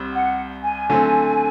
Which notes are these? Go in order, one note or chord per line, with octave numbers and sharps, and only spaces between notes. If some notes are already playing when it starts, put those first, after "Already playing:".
Already playing: C2 G3 C4
F#5
G#5
D3 F#3 A3 C4